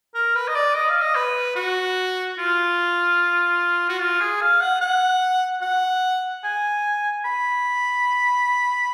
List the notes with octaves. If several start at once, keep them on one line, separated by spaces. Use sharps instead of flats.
A#4
B4
D#5
D5
D#5
F5
D#5
B4
F#4
F4
F#4
F4
G#4
F5
F#5
F#5
F#5
G#5
B5